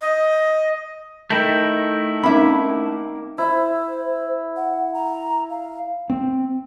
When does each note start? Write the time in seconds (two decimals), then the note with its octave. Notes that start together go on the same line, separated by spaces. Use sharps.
0.01 D#5
1.30 D#3 A3 E4 G6 A#6 D7
2.23 A#3 C4 C#4 D#4 E5 B5
3.38 E4 C5
4.56 F#5
4.94 A#5
5.50 F5
6.10 C4